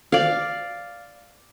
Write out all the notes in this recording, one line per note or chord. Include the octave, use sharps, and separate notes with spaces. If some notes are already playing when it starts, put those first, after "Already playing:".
D5 F5